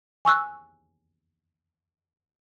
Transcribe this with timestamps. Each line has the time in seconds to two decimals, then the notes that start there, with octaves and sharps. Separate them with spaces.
0.25 G#5 C#6 E6 F#6